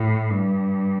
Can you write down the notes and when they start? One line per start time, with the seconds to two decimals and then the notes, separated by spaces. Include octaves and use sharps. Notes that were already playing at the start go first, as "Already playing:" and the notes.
Already playing: A2
0.29 G2